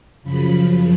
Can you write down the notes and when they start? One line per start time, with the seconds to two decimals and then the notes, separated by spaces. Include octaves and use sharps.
0.23 F#2 C#3 F3 B5